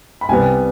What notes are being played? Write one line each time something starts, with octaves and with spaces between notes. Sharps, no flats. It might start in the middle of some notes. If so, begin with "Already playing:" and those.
B5
C2 C3 G3 B3 G#5